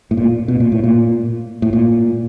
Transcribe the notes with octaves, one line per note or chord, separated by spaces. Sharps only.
A2
A#2
B2
A#2
A2
A#2
A2
A#2